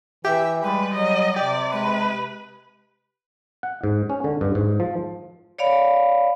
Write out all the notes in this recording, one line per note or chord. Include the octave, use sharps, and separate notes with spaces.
E3 G4 E5
G3 G#3 B4
F#3 D#5
C3 G4 D5
G#3 B4
F#5
G#2
C#4
D3
G2
G#2
F3
C#5 D5 F5 B5